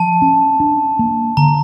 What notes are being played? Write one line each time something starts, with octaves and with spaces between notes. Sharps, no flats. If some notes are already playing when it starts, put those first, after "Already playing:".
Already playing: F3 A5
C#4
D4
A#3
D3 A#5